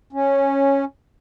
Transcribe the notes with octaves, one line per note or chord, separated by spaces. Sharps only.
C#4